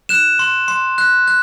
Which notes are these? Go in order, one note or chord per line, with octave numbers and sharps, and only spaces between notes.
F#6 E7
C6
C6
F#6
F#6